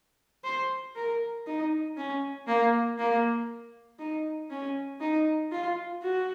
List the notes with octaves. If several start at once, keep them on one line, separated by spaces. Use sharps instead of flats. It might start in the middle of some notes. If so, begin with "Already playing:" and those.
C5
A#4
D#4
C#4
A#3
A#3
D#4
C#4
D#4
F4
F#4